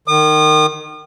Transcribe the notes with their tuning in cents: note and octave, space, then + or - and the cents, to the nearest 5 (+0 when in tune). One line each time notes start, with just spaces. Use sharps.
D#3 -20 D#6 -40